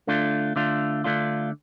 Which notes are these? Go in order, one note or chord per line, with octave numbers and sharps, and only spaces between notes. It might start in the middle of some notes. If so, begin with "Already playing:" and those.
D3 A3 D4 F4
D3 A3 D4 F4
D3 A3 D4 F4